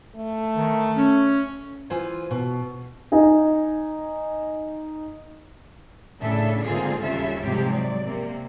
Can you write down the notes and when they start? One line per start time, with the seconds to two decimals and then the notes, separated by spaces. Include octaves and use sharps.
0.16 A3
0.55 D#3
0.96 C#4
1.90 E3 F4 C5 G#5
2.31 B2
3.12 D#4 D#5 G#5
6.19 A2 C#3 D4 A4 E5
6.62 G#2 D3 A#3 C4 F4 G#4
7.02 D#2 C#3 G3 F4 A4 E5
7.43 G#2 C3 F3 G3 G#3 G4
7.72 F#3 D5
8.04 C3 A#3